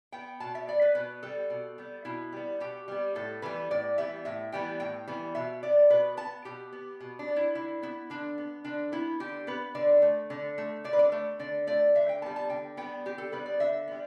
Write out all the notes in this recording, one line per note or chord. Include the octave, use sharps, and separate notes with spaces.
B3 G5
B2 A5
E5
B3 D5
B4
B2 B4
G3 B3 A4
B2
G3 B3
B2 E4
G3 B3
B2 G4
G3 B3
A2 A4
E3 G3 B3 B4
A2 D5
E3 G3 B3 E5
A2 E5
E3 G3 B3 G5
A2 G5
E3 G3 B3
B2 E5
B3 D5
B2 B4
B3 A5
B2 G4
B3
B2
D4
B3
E4
D3 E4
B3 E4
D3 D4
B3
D3 D4
B3 E4
D3 G4
B3 B4
D3 D5
A3
D3
A3
D3 D5
B4
D5
A3
D3 D5
A3 D5
D3 E5
G5
G3 B3 A5
A5
D3 G5
G3 B3 G5
D3 G4
A4
G3 B3 B4
D5
D3 E5
G3 B3